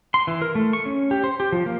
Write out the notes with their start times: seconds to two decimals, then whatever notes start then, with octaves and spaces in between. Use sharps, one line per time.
0.14 C6
0.27 E3
0.42 A#4
0.55 A3
0.73 C#6
0.86 C#4
1.11 G4
1.24 C5
1.40 G4
1.52 F3
1.66 A#3